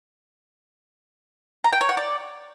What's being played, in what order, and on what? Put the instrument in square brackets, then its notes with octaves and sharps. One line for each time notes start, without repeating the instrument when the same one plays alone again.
[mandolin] A#5
G5
C#5
F#5
D5